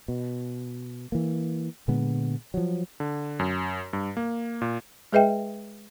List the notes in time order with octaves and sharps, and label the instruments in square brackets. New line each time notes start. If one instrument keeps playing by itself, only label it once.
[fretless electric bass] B2
E3 A#3
A#2 D3 G#3 B3
F3 F#3
[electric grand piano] D3
F#2
G2
A#3
A#2
[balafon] G#3 G#4 B4 D#5 E5 G5